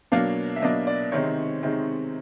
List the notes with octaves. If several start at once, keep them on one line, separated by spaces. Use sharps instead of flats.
B2 F#3 A#3 D4 F5
E5
B2 F#3 A#3 D4 D#5
D5
C3 D#3 G#3 C4 D#4 C#5
C3 D#3 G#3 C4 D#4